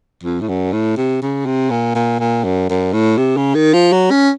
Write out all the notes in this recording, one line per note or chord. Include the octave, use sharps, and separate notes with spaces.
F2
A2
F#2
A2
C3
C#3
C3
A#2
A#2
A#2
F#2
F#2
A2
C3
C#3
D#3
F3
F#3
C#4